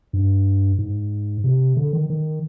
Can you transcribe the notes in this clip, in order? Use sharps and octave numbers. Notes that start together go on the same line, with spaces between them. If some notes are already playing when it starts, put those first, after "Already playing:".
G2
G#2
C3
D3
D#3
D#3